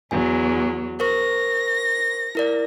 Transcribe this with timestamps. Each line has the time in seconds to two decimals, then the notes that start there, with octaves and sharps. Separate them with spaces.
0.11 E2 F#3 G#5
1.00 A#4 C5 C#6 A#6
2.35 E4 A#4 D5